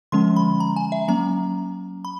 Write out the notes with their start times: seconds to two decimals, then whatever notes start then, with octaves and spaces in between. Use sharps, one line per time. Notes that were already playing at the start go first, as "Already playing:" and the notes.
0.12 D3 F3 G#3 C#4 C6
0.36 B5
0.60 A#5
0.76 G#5
0.92 E5
1.08 F#3 A#3 C#4 A#5
2.05 B5